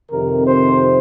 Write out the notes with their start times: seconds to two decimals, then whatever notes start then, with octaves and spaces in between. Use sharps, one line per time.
0.11 F2 C3 D#3 A#4
0.46 C5